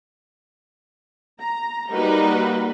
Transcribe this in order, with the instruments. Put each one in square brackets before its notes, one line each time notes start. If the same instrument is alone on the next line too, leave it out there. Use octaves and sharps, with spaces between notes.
[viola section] A#5
[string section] G3 D#4 [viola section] A#3 F#4 B4